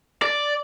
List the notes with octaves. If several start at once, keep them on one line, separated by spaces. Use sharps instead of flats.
D5